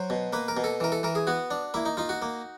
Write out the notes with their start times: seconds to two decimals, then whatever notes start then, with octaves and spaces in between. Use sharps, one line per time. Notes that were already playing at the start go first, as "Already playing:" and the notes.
Already playing: F#3 C5
0.10 B2
0.33 A#3 B4
0.48 A#4
0.57 B2
0.64 A4
0.80 E3 A#4
0.92 A4
1.03 E3 A#4
1.15 G#4
1.27 B3 F#4
1.51 D4
1.74 A#3 E4
1.85 D#4
1.97 D#4 F4
2.09 F#4
2.22 A#3